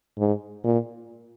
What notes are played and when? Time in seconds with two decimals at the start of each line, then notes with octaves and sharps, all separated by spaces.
0.18 G#2
0.64 A#2